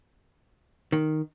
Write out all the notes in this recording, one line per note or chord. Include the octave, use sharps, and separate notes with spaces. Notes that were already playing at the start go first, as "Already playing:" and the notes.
D#3